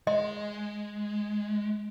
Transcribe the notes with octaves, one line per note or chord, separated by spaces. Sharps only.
G#3 D#5